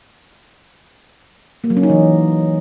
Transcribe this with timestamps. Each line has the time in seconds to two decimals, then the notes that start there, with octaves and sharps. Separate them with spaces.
1.64 A#3
1.70 F#3
1.77 C#4
1.83 D#4
1.90 E3